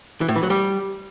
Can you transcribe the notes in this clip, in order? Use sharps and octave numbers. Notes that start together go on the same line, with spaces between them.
E3
A2
E3
F#3
G3